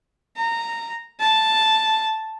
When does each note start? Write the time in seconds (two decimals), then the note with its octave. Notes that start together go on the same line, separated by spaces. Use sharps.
0.37 A#5
1.20 A5